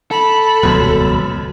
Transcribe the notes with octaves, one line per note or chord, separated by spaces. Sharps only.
A4 B5
D#1 C#2 F#2 B2